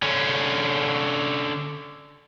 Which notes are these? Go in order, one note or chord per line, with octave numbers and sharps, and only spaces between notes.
D3 C#4